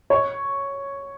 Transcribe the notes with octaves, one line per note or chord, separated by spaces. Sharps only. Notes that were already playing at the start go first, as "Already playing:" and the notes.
C#5